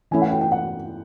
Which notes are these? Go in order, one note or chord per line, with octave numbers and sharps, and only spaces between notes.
E3 A3 C#4 E4 G#5
F#5
G5
G5
F#5